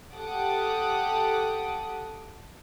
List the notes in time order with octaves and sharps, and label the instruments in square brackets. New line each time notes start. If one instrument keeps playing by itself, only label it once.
[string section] G4 A4 F#5 G5 D6 D#6